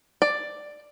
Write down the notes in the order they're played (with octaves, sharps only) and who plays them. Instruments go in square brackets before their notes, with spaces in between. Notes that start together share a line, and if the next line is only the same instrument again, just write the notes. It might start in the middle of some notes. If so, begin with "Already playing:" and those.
[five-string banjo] D5